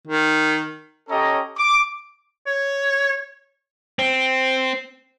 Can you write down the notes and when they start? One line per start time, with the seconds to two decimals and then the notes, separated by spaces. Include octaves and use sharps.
0.07 D#3
1.09 C#4 G4 A4 C#5 D#5 A#5
1.57 D6
2.47 C#5
3.99 C4